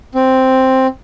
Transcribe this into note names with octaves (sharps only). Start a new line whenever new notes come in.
C4